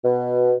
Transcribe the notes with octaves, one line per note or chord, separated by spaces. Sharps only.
B2